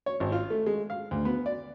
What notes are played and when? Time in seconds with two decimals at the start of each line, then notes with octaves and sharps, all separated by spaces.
0.06 C#5
0.20 G#1
0.32 F4
0.50 A3
0.66 G#3
0.90 F5
1.11 D2
1.25 B3
1.46 D5